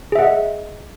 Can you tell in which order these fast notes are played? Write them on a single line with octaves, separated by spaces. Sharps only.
G#4 E5 F#5 D#5